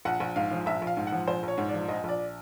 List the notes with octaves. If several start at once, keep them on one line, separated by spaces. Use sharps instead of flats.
A#1 F#5
A#1
G#2 F5
F3
A#1 E5
A#1
F5
G#2
F#5
F3
A#1 C5
A#1 C#5
G#2
F3 D5
A#1 D#5
A#1 D5